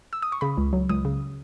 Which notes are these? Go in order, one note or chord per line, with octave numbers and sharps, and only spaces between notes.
E6
D#6
C#6
C#3 B5
C#2
F#3
C#2 D#6
C#3